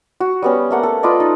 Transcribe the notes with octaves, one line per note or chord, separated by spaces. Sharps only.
F#4
G3 B3 C#4
A3 A#3 F#5
A4
F4 B4 D5 D#5
D#4